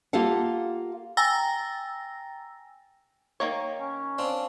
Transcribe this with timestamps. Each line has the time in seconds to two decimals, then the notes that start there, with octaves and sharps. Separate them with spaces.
0.13 A#3 F4 G4 A4 F5 F#5
1.17 G5 G#5 A#5 E6 A6 A#6
3.40 D#3 A#3 C#5
3.80 C#4
4.18 C4 D4 F4